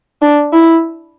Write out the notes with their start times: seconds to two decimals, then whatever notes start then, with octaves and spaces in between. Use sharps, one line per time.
0.22 D4
0.53 E4